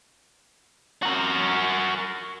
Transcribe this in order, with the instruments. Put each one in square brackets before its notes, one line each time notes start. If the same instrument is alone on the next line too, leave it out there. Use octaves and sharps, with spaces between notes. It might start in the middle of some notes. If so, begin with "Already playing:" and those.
[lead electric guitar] F#4 A#4